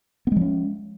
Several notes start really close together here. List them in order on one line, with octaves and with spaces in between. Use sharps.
B3 G#3 F3 C#4